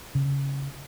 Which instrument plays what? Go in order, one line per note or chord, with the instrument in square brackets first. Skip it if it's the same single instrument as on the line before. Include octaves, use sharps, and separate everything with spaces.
[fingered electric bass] C#3